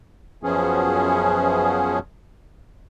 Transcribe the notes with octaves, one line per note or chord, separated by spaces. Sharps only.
F#2 F3 B3 C#4 G#4